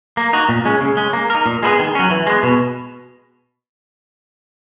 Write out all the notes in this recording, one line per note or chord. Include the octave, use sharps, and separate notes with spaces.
A#3
D#4 F#4
A#2
G#3 C#4
C#3
G#3 C#4
A#3
D#4 A#4
A#2
G#3 B3 E4 G#4
D#3
F#3 C#4
E3
G#3 B3
B2